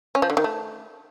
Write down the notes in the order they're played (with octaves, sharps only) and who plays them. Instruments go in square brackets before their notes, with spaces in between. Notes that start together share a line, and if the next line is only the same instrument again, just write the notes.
[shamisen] C#4
F3
D3
D#3
A3